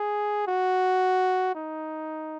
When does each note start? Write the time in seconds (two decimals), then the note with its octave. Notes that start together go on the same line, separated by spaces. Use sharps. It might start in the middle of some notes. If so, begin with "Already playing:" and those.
Already playing: G#4
0.47 F#4
1.55 D#4